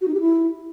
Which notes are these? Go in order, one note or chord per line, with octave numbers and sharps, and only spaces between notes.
F#4
D#4
G4
E4